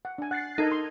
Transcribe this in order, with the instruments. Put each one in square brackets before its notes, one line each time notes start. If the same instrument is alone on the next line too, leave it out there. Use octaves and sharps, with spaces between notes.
[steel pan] F#5
D4 G#5
[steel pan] F#5 [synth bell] F#6 A6 C7
[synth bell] D#4 G#6 [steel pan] A4 A#4 D#5
[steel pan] C6